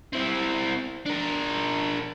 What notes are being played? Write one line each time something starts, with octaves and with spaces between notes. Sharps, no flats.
C4 E4
D4 A#4